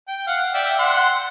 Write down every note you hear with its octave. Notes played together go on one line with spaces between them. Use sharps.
G5
F5 F#5
D5 E5 G5
F#5 C6